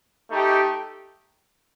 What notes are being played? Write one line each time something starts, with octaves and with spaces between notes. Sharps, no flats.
A3 D#4 G4